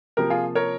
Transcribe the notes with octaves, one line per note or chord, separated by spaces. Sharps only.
C3 F3 A#3 G4 A#4
F4 G#4
A#4 C#5